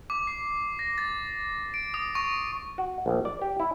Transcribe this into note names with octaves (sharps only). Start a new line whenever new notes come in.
D6
C7
A#6
A6
D7
D#6
C#6
F#4
A#1
D5
G4
E4